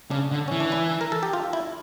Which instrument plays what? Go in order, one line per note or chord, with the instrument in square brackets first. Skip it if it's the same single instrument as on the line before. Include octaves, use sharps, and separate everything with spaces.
[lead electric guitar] C#3 [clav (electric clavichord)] D4
[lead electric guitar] D3
[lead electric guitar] E3 [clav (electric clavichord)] C#4
[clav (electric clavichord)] D4
E4
A#4
A4
G4
F4
E4